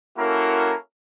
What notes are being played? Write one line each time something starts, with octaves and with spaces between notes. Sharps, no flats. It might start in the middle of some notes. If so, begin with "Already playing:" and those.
A#3 C#4 E4 F#4 A4 A#4